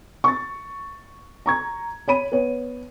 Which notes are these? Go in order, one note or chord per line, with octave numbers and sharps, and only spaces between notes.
C#6 A6
A#5 C#6 G#6
C#5 B5 D#7
B3 C#5